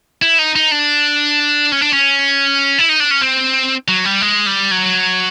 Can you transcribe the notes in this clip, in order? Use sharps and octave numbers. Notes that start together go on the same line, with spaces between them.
E4
D#4
D#4
D4
C#4
D4
C#4
E4
D#4
D4
C#4
C4
F#3
G3
G#3
G3
F#3